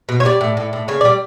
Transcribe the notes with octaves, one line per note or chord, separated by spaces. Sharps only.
B2
C#5
G3 D5
A2
A2
A2
C#3 C#5
G3 D5